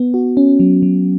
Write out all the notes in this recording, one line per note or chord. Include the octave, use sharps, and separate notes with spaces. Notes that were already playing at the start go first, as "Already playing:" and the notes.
Already playing: B3
F#4
C#4
F#3
F#3